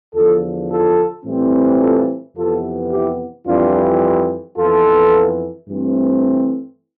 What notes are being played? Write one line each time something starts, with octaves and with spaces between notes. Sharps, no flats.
E2 D3 F3 F4 A4
F4 A4
A2 E3 G3 C4
F4 A4
F2 C3 E3 B3 F4 A4
E4 G4
F2 E3 G3 C4 D4 F4
F2 E3 B3 F4 A4
G2 E3 A3 C4